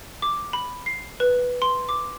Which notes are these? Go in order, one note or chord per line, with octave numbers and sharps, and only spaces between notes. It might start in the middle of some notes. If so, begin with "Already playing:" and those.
D6
B5
C7
B4
C6
D6